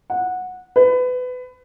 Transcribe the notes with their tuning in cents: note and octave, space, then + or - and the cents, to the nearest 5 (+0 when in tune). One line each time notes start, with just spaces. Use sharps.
F#5 -15
B4 +25